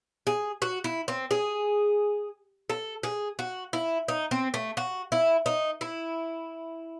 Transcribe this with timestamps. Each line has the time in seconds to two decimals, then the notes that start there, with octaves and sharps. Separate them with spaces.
0.27 G#4
0.62 F#4
0.84 E4
1.08 C4
1.31 G#4
2.70 A4
3.03 G#4
3.39 F#4
3.73 E4
4.08 D#4
4.31 C4
4.54 A3
4.77 F#4
5.12 E4
5.46 D#4
5.81 E4